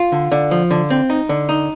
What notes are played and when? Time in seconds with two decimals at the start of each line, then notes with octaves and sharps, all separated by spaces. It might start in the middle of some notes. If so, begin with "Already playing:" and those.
Already playing: F4
0.12 D3
0.31 D3
0.51 F3
0.71 D3
0.90 C4
1.10 D#4
1.29 D3
1.49 D#4